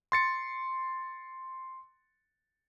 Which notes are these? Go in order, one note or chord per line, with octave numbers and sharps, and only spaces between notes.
C6 A6 C#7